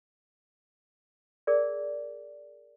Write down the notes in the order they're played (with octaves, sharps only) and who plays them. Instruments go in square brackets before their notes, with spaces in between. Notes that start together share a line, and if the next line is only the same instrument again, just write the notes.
[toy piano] G#4 A#4 D5